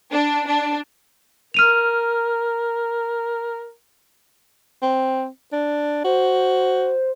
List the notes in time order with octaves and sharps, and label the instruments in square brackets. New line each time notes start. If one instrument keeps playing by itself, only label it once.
[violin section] D4
D4
[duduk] A#4 [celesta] F6 D#7 F7
[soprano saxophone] C4
D4
[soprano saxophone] F#4 [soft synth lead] C5